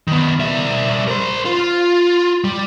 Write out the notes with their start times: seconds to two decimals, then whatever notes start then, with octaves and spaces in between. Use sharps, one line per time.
0.08 D#3 B3
0.40 G3 E5
1.08 A#4 C5
1.45 F4
2.44 G3